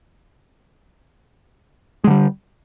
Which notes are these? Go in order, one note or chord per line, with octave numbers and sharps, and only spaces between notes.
D3 G3 G#3